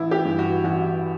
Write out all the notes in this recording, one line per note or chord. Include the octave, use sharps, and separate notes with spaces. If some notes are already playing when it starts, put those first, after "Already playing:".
Already playing: A1 E4
G4
G2 E3
F#4
A1 F#4